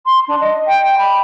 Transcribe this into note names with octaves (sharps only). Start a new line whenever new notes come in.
C6
D4
D#5
G5
B5